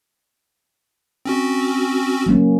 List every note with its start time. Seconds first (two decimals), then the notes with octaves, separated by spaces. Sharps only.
1.25 C4 C#4 F#4
2.26 F#3 A#3 C#4